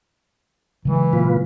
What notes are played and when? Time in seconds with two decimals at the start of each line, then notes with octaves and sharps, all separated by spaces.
0.85 C#3 E3 F#3 G#3
1.13 A#2 F4 B4